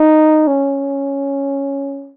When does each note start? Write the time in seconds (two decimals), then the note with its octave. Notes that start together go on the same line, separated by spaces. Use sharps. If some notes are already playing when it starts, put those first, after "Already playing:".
Already playing: D#4
0.47 C#4